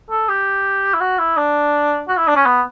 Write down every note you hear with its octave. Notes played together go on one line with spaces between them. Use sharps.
A4
G4
E4
F#4
E4
D4
F#4
E4
D4
C#4
B3